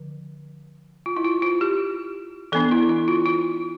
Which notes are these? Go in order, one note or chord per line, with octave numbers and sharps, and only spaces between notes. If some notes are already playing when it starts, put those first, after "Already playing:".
Already playing: D3 F3
F4
E4
F4
F4
G4
E3 B3 D4 A4
E4
E4
F4
F4